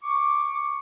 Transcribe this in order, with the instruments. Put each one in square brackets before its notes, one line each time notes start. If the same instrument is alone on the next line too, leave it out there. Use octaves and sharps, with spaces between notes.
[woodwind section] C#6 D6